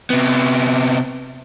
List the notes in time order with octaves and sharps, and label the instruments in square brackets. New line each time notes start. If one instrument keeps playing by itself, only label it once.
[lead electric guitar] C3 B3